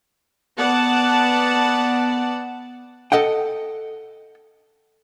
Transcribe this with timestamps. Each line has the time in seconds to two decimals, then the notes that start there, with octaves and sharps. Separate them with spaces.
0.58 B3 D5 F#5 A5
3.12 A4 D#5 F#5 G5